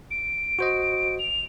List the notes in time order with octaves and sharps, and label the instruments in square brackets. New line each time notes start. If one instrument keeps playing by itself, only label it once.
[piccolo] D7
[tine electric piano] F#4 C5 D#5
[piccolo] F7